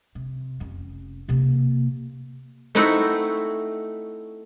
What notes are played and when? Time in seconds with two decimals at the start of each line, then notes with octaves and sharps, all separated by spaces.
0.15 C3
0.60 F1 C#4
1.28 C3 A#3
2.75 A3 C4 D#4 E4 F#4